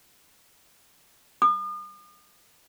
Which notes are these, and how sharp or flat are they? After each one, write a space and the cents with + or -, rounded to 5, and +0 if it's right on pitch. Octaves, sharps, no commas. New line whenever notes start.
D#6 -45